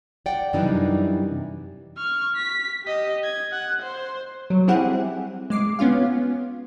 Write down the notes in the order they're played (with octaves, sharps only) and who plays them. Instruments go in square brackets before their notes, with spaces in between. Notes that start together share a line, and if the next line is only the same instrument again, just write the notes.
[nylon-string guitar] D5 F#5 G5
F#2 C3 E3 G3 D4 D#4
[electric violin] C#6 F6
B6
G4 D#5
G#6
F#5
C5
[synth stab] F#3
G3 C4 E4 G4 G#4 F#5
G#3 D6 C7
B3 C#4 F4 F5